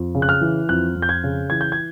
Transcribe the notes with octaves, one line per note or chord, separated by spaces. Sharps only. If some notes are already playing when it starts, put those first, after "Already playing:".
Already playing: F2
C#3
F#6
F6
E3
F2 F#6
F2
G6
G#6
C#3
E3 G#6
G6
G#6